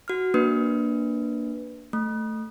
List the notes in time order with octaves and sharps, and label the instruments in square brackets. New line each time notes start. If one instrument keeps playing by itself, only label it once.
[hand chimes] F#4 F6
A#3 D4 B4
A3